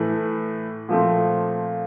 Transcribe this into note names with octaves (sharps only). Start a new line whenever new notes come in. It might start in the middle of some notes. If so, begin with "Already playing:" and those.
Already playing: A2 E3 A3
A#2 F3 A3 C4